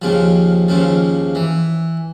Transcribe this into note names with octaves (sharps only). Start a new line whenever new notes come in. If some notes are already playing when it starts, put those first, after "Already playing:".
D#2 C#3 F3
D#2 C#3 F3
E3